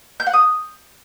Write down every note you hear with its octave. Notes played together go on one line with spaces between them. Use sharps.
G6
F#5
D#6